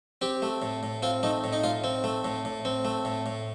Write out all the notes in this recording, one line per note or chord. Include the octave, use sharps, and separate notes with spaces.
C4 G4
A3
A2
A2
C4 F4
A3 D#4
A2
D#4
A2 F4
C4
A3
A2
A2
C4
A3
A2
A2